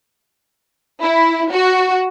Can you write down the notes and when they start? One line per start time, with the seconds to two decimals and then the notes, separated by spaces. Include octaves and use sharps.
1.01 E4
1.52 F#4